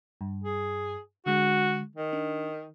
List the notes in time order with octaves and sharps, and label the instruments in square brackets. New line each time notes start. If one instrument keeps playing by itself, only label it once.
[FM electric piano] G2
[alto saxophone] G#4
[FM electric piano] D3 G#3 [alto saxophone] F#4
[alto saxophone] D#3
[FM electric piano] D4